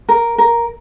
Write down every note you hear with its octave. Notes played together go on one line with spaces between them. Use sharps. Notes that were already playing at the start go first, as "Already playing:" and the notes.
A#4
A#4